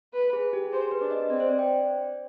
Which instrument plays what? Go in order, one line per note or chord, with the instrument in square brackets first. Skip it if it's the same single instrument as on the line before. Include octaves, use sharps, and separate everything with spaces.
[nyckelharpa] B4
[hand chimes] G#4
G4
[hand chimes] G#4 [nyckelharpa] C5
[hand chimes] B4
[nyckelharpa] D4
[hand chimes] D#5
[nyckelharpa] C4 [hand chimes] D5
[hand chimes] C5
D5
G5